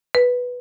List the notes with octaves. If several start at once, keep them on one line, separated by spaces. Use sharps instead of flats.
B4